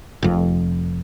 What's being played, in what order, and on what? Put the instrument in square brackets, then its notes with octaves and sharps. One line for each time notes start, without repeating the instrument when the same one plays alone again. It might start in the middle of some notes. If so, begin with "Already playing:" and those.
[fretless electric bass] F1 F2